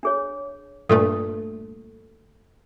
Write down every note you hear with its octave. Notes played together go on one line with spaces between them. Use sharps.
D4 G#4 C#5
G2 A#2 A3 A4